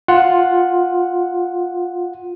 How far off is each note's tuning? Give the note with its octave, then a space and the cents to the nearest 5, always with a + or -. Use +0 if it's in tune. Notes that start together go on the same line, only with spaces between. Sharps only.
F4 +10 F#5 +0